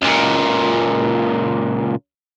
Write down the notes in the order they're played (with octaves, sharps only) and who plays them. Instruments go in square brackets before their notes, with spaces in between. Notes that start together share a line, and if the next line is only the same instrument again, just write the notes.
[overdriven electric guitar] C#2 A#2